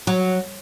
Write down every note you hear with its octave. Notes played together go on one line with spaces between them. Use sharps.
F#3